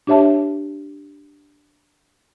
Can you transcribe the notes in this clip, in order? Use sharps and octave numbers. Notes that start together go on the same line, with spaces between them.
D4 G4 C#5 E5 A5